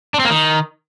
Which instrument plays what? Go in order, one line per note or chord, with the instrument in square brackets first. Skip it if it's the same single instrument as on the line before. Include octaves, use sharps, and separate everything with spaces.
[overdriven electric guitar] D4
C4
A#3
D#3